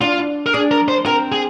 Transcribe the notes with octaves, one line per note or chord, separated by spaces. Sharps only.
D4 F4
A#4
D4 G#4
A#4
C5
C4 A#4
G#4